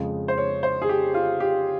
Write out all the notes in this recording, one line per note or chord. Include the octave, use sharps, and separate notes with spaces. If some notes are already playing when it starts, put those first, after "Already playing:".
Already playing: F2 C#3 G#3
C5
C#5
C5
G#4
G4
F4
G4